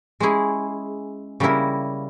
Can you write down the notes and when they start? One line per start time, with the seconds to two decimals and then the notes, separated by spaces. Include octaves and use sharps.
0.20 G#3 C#4 E4 G#4
1.40 C#3 G3 A#3 E4 A#4